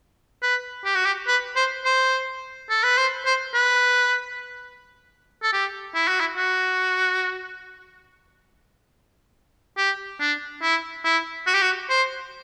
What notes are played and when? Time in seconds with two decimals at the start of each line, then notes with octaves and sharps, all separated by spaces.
0.43 B4
0.85 G4
0.95 F#4
1.05 G4
1.27 B4
1.56 C5
1.85 C5
2.70 A4
2.84 B4
2.98 C5
3.26 C5
3.54 B4
5.43 A4
5.53 G4
5.95 E4
6.08 F#4
6.20 E4
6.37 F#4
9.77 G4
10.20 D4
10.62 E4
11.05 E4
11.47 F#4
11.54 G4
11.62 F#4
11.90 C5